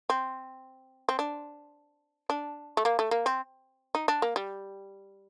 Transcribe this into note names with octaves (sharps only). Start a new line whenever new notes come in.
C4
C4
D4
D4
A3
A#3
A3
A#3
C4
D#4
D4
A#3
G3